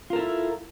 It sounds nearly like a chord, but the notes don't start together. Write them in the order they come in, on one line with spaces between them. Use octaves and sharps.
F4 A#4 A4 E4